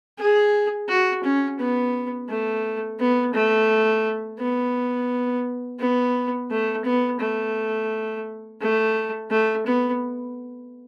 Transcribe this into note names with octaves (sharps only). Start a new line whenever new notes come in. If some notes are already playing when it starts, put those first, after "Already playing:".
G#4
F#4
C#4
B3
A3
B3
A3
B3
B3
A3
B3
A3
A3
A3
B3